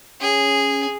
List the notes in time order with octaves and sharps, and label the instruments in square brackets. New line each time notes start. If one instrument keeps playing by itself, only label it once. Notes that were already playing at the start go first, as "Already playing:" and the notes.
[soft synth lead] C#4 [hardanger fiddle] G#4